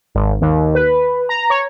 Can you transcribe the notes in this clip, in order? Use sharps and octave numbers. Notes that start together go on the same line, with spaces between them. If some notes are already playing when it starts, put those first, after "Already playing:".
G#1
D#2
B4
A#5
C#5